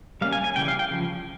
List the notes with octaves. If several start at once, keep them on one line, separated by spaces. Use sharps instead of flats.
G3 A#3 C#4 F5
G#5
G#5
C#3 E3 G3 G5
F5
G5
C#3 F3